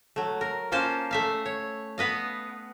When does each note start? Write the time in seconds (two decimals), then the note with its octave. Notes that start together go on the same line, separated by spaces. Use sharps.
0.16 F#3 A3
0.41 A#4
0.72 A#3 C#4 F4 C5 A5
1.11 A3 E5 F5
1.46 C#5
1.98 B3 B4 D#5 F5